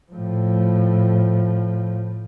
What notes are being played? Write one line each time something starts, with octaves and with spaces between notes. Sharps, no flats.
A2 F3